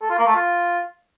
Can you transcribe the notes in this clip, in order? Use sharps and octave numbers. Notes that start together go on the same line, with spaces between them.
A4
F4
A#3
A3
F4